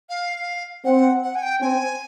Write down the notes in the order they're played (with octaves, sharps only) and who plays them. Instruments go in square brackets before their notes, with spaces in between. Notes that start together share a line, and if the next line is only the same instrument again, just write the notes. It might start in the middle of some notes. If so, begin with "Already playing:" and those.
[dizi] F5
[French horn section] C4 [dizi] F#5
[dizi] F#5
G#5
G5
[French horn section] C4 [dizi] G#5